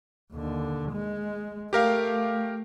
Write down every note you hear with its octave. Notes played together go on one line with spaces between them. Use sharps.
D#2 D3
G#3
A3 G4 A#4 F5